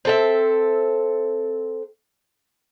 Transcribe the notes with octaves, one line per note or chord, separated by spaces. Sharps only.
C4 A4 E5